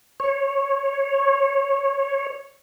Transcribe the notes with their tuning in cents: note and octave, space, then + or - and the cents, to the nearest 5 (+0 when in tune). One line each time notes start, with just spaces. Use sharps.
C#5 -15